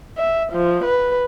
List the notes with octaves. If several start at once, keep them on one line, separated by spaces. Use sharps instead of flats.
E5
F3
B4